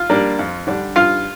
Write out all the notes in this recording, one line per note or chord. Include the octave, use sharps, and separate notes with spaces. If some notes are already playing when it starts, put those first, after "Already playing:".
Already playing: F4 F5
G3 A#3 D4
F2
D3 G3 D4
G2 F4 F5